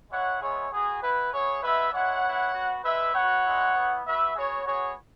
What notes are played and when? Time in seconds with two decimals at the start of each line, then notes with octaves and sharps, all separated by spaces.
0.10 G#3 E4 C#5 F#5
0.41 G#3 B3 E4 G#4 C#5
0.71 B3 F#4 G#4
1.01 B3 E4 B4
1.32 B3 E4 G#4 C#5
1.62 G#3 B3 E4 B4 E5
1.92 G#3 E4 C#5 F#5
2.24 B3 E4
2.53 B3 F#4
2.83 G#3 E4 B4 E5
3.14 B3 F#4 C#5 F#5
3.45 G#3 E4
3.75 B3 E4
4.05 B3 F#4 B4 E5
4.35 B3 F#4 G#4 C#5
4.65 B3 F#4 G#4 C#5